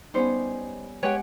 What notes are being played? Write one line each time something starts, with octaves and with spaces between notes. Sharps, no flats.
G3 B3 C#4 D#4 C5
G#3 G4 B4 C#5 F#5 G5